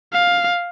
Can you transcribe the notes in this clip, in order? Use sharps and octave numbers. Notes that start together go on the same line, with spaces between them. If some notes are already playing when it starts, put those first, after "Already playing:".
F5